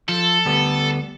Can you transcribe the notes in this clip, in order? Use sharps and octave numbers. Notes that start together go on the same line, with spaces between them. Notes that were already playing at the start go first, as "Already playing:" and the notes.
F3 A4
D2 G3 B3